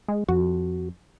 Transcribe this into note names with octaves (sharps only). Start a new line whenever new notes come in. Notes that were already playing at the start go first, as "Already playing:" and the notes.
G#3
F2 F#4